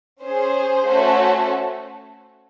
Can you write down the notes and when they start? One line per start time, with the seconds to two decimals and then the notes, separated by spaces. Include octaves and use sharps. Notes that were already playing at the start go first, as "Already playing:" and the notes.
0.23 C#4 G#4 C5
0.86 A3 C#4 F#4 A4